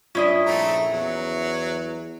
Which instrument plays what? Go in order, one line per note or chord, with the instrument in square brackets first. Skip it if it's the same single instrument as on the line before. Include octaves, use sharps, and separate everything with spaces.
[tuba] G2 [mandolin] C#4 E4 D#5 [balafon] F4 D5
[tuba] A#1 [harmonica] A3 C4 A#5
[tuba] E2 [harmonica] F#3